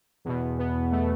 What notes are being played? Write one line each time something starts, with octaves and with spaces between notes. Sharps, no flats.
E2 B2
B3
A3